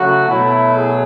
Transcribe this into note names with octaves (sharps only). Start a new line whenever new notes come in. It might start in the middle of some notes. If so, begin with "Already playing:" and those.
Already playing: C#3 F#3 A3 F#4
B2 F#3 A3 E4
G#4